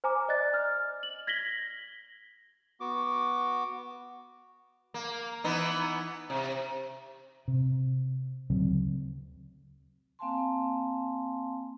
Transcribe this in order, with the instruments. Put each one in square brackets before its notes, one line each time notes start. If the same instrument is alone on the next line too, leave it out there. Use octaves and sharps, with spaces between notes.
[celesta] C5 G#5 A#5 D6
D5 D#5 F#6 A6
F6
F#7
G#6 A#6 B6 F#7 G7
[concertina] B3 F#4 D6
[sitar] A#3
E3 B3 D#4
C3
[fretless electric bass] C3
D2 C#3 F#3 C4
[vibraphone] A#3 C4 F5 G#5 A5 C6